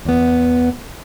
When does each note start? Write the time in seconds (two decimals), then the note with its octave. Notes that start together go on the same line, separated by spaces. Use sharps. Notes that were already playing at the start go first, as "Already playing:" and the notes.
0.05 E2 B3